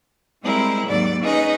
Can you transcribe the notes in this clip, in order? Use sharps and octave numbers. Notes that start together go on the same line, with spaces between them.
G3 G#3 C4 E4 A#4
D#2 G#2 F#3 D5
C#4 D#4 G#4 B4 D#5